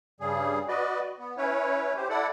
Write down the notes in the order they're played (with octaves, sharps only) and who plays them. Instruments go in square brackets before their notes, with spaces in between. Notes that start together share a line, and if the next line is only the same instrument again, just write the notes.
[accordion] G2 C#3 G3 G#4
F#4 B4 D5 D#5
B3
C#4 E4 B4 C#5
G4 C5
E4 A4 D5 F#5